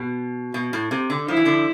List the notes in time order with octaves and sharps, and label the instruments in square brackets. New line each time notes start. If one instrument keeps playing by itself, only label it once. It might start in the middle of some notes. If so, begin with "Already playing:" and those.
Already playing: [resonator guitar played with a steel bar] B2
B2
A2
C3
D3
[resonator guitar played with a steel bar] F3 [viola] E4
[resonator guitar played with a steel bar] E3
D3 F3